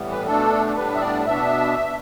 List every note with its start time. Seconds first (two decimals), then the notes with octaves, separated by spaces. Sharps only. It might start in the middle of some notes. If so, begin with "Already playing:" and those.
Already playing: A2 E3 G3 B3
0.11 B4
0.27 B2 A3 D4 A4
0.76 A2 G3 B3 D4 B4
0.95 E5
1.01 D5
1.26 B2 B3 D4 E5